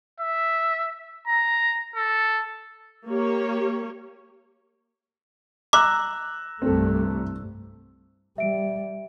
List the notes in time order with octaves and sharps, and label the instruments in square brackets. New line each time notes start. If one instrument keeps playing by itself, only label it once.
[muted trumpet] E5
A#5
A4
[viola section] A#3 G4 C#5
[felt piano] A#5 E6 F#6 [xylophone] D6
[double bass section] C2 G2 A3 [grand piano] C4 A4
[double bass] G3 [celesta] E5 D7